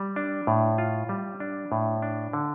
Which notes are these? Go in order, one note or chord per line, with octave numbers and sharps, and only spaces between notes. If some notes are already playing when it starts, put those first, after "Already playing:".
Already playing: G3
D4
A2
F4
G3
D4
A2
D4
D3